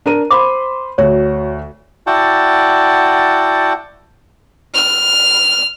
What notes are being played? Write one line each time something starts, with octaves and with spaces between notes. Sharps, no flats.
D4 A#4 D#7
C5 B5 C6 D6
D2 F#4 C#5
E4 F#4 D5 F#5 G5 A5
F6